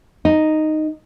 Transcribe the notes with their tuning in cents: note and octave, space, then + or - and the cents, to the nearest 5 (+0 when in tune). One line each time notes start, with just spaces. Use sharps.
D#4 -5